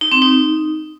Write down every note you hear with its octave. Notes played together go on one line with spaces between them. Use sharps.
D#4
C4
D#4